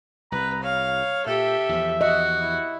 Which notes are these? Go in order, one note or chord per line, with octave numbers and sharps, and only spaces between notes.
C2 B4 A#5
C#5 F5
A#2 G4 A4 E5
E2 F3
F#4 D#5
E4